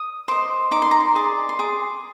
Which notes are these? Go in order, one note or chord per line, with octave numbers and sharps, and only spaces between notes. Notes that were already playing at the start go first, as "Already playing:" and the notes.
Already playing: D#6
C5 D#5 D6
D#4 D6
C6
A#5
C6
G#4 D5 D6
C6
G#4 D6